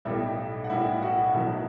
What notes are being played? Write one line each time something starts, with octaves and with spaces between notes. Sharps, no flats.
B1 A2 G3 E4 E5
F#5
B1 A2 G3 E4 E5
F#4 F#5
B1 B2 F#3 E4 E5